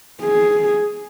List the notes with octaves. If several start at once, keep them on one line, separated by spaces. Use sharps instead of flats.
G#4